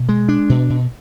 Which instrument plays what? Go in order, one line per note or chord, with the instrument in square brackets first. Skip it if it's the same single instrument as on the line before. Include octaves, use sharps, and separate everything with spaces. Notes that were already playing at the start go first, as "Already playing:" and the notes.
Already playing: [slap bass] B2
G#3
D4
B2
B2